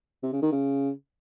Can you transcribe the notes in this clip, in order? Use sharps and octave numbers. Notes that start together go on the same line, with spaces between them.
C3
C#3
D#3
C#3